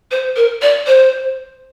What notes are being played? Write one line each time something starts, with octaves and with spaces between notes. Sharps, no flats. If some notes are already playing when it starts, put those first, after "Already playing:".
C5
A#4
D5
C5